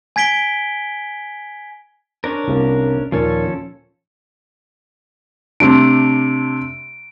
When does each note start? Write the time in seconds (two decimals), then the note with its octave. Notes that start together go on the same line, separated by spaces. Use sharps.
0.16 G#5 G#6 B6 D7 G7
2.24 C#4 D4 A#4 C5
2.48 C2 C3 A#3
3.12 D#2 A#2 F3 C#4 A4
5.60 C3 A3 D4 D7